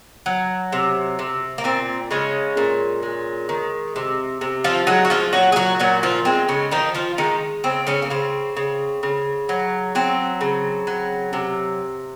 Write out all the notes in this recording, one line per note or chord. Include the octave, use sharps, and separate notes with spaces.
F#3
C3
C3
A#3
A#2 C4
C#3 G#3 C#4
A#2
G#3
D#3
C3
C3
F3 F4
F#3 G#3 F#4
F#4
F3 F4
A#2 F#3 F#4
G#4
F#3 F#4
A#2 F#3 F#4
F3 F4
G#3 C4
C#3 C#4
D#3 F3 D#4
F3 F4
D#3 G#3 D#4
C#3 C4
C#3 C#4
A#3
C#3 C4
C#3
C#3
F#3
F#3 C4
C#3
F#3
C3